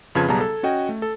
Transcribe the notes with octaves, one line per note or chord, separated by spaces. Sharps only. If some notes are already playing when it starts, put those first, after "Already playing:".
F2 C#3 F4 B4 A5 G#6
B1 G3 B3 G#4 A5 A#5
A4
C#4 F#4 D#5 G5
A3
A4